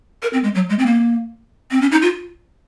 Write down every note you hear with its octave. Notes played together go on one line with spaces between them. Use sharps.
A#4
C4
G#3
F#3
G#3
C4
A#3
C4
C#4
D#4
F4